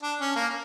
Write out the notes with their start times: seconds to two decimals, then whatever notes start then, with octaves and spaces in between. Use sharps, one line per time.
0.03 D4
0.20 C#4
0.36 A#3